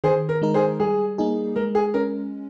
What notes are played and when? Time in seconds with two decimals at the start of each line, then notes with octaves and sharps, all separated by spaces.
0.04 D#3 G#4 C5
0.29 A#4
0.42 G#3 D#4 A#4
0.54 G#4 C5
0.80 G3 G#4
1.18 A#3 D#4 G#4
1.56 G#3 A#4
1.75 G#4
1.94 C#4 A#4